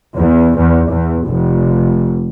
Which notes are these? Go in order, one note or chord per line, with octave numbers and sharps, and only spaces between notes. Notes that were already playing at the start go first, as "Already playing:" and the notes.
E2
E2
E2
F1